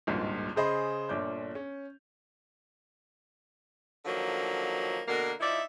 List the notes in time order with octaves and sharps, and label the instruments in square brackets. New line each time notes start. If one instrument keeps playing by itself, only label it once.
[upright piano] G#1 C#2 G2 A#2
C#3 G#4 C5 D#5 B5
G1 A#2 D4 C#5 D6 G6
C#4
[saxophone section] D3 D#3 F3 F#3 A#3
B2 D3 A#3
F3 D#4 E4 D5 E5